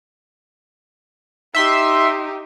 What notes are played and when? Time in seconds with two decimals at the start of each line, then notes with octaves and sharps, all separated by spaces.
1.55 D#4 G4 E5 C6